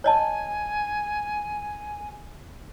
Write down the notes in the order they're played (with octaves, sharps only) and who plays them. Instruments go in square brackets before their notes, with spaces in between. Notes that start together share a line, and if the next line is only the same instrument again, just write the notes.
[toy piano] C#5 D#5 A5 [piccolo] G#5